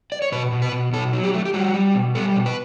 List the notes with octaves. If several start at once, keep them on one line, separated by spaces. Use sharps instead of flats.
D5
C#5
B2 B4
B2
B4
B2
B2 A4
F#3
G4
A3
G4
G3 F#4
G3
B2
G3 A4
B2
B4